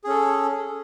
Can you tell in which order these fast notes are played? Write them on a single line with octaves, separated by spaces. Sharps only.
G#4 C#4 A4